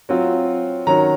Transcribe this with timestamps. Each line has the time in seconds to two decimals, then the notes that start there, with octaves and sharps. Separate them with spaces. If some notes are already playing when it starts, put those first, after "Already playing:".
0.09 F#3 C4 F4
0.87 D#3 F#3 C#4 A#5